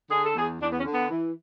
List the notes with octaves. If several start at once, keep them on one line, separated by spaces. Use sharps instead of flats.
D3 G#4
A4
E2 G#4
E2 D4
B3
C#4
D3
B3
E3